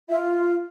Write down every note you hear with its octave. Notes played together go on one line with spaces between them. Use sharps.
F4 E5